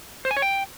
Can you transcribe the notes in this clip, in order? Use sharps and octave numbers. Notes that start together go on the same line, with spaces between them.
C5
G#5
C#5
G5